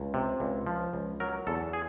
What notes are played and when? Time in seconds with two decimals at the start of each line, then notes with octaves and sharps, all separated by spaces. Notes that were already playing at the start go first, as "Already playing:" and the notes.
Already playing: C#2
0.14 C3
0.40 C#2
0.67 F3
0.93 C#2
1.20 F#3 A#4
1.47 E2 A4
1.73 G#4